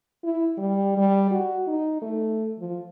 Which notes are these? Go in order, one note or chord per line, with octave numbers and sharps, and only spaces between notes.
E4
G3
G3
F#4
D#4
A3
F3